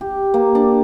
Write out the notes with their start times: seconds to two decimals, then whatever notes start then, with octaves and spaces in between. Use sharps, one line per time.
0.01 G4
0.34 A#3
0.55 D4